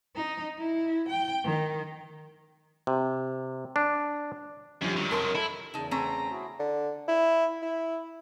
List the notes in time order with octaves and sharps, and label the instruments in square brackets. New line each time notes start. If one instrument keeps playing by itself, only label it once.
[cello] D#4
E4
G5
D#3
[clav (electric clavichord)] C3
D4
[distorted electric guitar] F#2 [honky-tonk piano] D3 F3 G3
[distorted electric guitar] D#3 F#3
[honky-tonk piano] F1 A5 C6 [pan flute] A#4
[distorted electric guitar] E4 [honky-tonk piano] A4
[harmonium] E2 C#3 [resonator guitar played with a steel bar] D#4 A5
[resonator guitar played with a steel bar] A3 C4 C#4 [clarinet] A#5
[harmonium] E4 F#4 G#4
[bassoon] D3
E4
E4